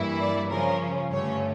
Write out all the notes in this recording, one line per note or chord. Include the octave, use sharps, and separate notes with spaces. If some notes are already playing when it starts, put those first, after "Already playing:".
Already playing: G2 E3 A#3 E4
D5
C#3 F3 C#4 A#4
G2 D3 A3 C#4 C#5